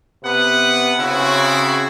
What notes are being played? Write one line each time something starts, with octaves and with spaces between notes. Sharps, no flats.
C3 B3 B4 F#5
C#3 C4 E4 F#4